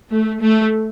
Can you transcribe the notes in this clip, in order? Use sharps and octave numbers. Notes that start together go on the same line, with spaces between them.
A3
A3